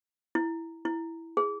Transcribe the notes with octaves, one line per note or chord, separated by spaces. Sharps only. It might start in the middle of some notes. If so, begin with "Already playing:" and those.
E4
E4
G#4